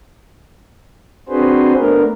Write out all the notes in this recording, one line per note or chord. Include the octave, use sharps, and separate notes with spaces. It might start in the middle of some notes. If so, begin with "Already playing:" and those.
C4 D4 F#4 G#4 B4 C5
A3 B3 D4 A#4